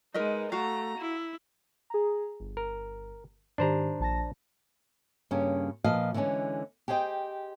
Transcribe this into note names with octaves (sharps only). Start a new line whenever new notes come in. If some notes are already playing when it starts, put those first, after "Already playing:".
G#3 D#4 A#4 B4 D#5
A3 F#4 F5 A#5
E4
G#4 A#5
G1
A#4
G#2 D#3 D4 G4 C5 A#5
A#1 A5 A#6
G2 C#3 A#3 C#4
A#2 F3 B4 D#5 F5
D3 E3 G#3 C4 C#4
G4 G#4 C5 D#5 G5